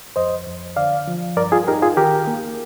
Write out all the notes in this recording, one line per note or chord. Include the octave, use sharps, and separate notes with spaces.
F2 C5 D#5
F2
D3 D5 F5
F3
G2 A#4 D5
F4 G#4
D#4 G4 A#4
F4 G#4
D#3 G4 A#4
A#3